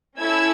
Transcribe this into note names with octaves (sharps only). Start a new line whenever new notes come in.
C#4 E4 A4 E6 G#6